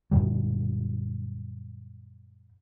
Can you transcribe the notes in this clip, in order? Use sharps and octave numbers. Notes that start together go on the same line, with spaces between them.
F#2 A#2 D3 G3